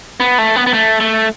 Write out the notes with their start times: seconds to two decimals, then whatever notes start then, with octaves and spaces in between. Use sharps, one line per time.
0.20 B3
0.38 A3
0.56 B3
0.66 B3
0.74 A3
1.01 A3